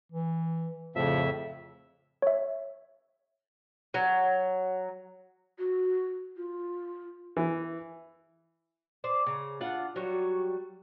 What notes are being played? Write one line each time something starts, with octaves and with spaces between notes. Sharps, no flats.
E3
F2 A2 C#3 F3 E5
C#5 E5
F#3
F#4
F4
E3
C5 D5
C#3 A#5
D4 F4 F#5
F#3 G3 F#4 C#5